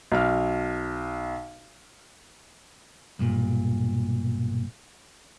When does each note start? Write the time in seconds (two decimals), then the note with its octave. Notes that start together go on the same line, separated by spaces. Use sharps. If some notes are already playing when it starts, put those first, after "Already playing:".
0.12 B1 F6
3.19 B1 G2 A#2